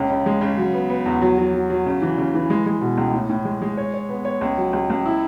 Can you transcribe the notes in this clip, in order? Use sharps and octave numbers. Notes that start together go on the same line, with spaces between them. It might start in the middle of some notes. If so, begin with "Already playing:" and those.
Already playing: C#2 C#4
C#3
G#3
C#3
F#3
B3
B3
E2
F#3
F#3
F#3
F#3
C#3
E3
C#3
E3
G#3
G#3
B2
C#2
A2
A2
G#3
G#3
C#5
C#5
B3
C#5
C#2
F#3
C#2
C#2
E4